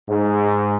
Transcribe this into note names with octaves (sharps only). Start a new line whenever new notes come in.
G#2